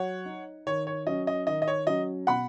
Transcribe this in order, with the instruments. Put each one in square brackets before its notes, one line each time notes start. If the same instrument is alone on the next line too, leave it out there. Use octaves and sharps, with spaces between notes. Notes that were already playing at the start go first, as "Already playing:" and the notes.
Already playing: [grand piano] F#3 [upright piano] C#5 F#5
[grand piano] D#4
[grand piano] D#3 [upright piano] C#5
[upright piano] C#5
[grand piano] F#3 C#4 [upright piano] D#5
[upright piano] D#5
[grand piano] D#3 [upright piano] D#5
[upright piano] D#5
C#5
[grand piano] F#3 C#4 [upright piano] D#5
[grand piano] B2 [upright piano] F#5 B5